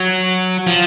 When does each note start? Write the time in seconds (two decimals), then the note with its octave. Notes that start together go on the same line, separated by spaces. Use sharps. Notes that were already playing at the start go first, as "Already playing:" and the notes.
Already playing: F#3
0.67 F3